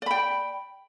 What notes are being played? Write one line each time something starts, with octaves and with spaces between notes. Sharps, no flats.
D5 G5 B5